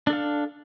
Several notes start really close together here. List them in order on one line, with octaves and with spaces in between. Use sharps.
D4 A4 F5